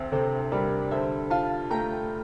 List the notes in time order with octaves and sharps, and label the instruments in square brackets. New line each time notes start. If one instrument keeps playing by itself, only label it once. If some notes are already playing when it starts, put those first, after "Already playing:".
Already playing: [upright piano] D2 C4
[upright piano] C3 [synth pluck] A4 C5
[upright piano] G3 [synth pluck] A#4 D5
[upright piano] D3 [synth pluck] C5 E5
[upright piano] F4 [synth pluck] F5 A5
[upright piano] A3 [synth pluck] G5 A#5